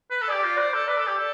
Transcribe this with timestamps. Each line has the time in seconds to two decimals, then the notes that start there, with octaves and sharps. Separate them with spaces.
0.11 B4
0.22 A4
0.29 G4 D5
0.44 F4
0.58 C5 D5
0.74 A4
0.88 B4 D5
0.97 A4
1.07 G4
1.18 A4